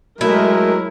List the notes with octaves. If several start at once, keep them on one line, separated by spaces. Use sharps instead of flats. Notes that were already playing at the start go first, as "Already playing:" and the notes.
F#3 G#3 A3 E4 A#4